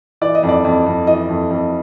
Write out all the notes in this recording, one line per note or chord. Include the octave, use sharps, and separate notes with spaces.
E3 D5
D#5
F2
D5
F2
F2
E3 D#5
F2
F2